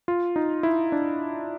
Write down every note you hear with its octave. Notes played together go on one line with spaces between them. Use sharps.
F4
D#4
E4
D4